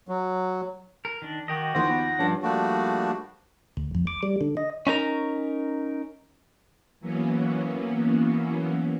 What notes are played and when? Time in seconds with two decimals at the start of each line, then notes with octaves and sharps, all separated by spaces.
0.08 F#3
1.05 A#4
1.22 D#3 D4
1.48 D#3 F#4 G4 D#5
1.75 D#2 D#3 F3 C5 F#5 A#6
1.89 B3
2.19 G2 F3 C#4 D4
2.42 F3 G3 A3 A#3 D4 F#4
3.77 D2
3.95 F2
4.07 D6
4.23 G3
4.41 D3
4.57 D#5
4.87 C#4 D#4 A#4 A#5
7.00 E3 F#3 A#3 B3 C#4